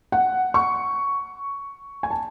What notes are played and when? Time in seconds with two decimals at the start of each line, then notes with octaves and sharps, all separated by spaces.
0.12 F#5
0.54 C#6
2.03 G#5
2.11 A5